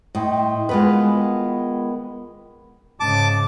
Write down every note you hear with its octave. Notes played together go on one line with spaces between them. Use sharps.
A2 D#5 G5 C6
D#3 G#3 B3 F4 F#4 B4
G#2 C#3 A5 D6